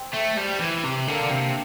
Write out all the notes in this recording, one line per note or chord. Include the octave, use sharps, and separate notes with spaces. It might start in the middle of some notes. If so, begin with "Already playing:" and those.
Already playing: C4
A3
G3
E3
C3
D3 A#3 D4
C3